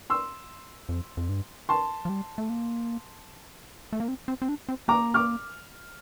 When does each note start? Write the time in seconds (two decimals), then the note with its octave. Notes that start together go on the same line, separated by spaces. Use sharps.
0.10 C6 E6
0.89 F2
1.17 F2
1.29 G2
1.69 A5 C6
2.05 F3
2.09 G3
2.38 A3
2.49 A#3
3.93 A3
4.00 A#3
4.08 C4
4.28 C4
4.42 C4
4.49 D4
4.69 C4
4.88 A#3 A#5 D6
5.14 D6 F6